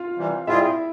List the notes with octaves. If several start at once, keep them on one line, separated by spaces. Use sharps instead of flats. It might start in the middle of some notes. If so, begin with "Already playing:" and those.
Already playing: F4 F5
C3 E3 G3
G3 C4 E4 F4 G#4 E5